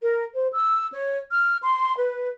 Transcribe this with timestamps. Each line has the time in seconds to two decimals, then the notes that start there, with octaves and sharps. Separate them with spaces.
0.03 A#4
0.34 C5
0.53 E6
0.93 C#5
1.30 F6
1.62 C6
1.98 B4